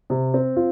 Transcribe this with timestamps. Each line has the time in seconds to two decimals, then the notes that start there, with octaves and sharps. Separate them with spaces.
0.10 C3
0.34 C4
0.57 F4